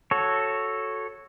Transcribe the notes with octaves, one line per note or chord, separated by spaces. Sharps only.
F#4 A4 C#5